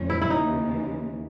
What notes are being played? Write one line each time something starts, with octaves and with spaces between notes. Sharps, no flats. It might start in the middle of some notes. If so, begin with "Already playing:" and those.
Already playing: F2 D3 F3 A3 C#4
E4
E4
D#2 C#3 E3 D#4